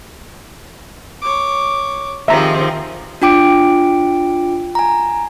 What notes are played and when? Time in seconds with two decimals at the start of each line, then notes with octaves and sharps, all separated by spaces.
1.22 C#5 D6
2.28 D#3 F3 C4 G4 G#4 E5 A#5
3.22 D4 F4 G5 D6 D7
4.75 G#5 A#5